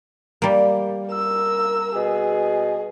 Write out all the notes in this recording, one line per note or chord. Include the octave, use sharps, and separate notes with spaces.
G3 A#3
A#4 E6
B2 G#4